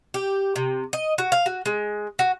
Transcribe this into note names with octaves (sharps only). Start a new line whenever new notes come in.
G4
C3
D#5
F#4
F5
F#4
G#3
F#4